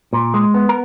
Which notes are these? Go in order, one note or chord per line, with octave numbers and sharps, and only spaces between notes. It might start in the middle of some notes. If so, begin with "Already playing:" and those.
A#2
G#3
B3
A#4